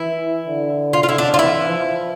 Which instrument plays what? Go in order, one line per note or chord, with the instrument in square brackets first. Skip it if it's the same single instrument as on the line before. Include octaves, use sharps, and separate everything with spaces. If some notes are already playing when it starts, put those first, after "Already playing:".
Already playing: [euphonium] E3 [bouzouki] E4
[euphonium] D3
[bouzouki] F4
F4
[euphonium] D3 [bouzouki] E4
[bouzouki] D4
F4
[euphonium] E3 [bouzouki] E4
[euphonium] F3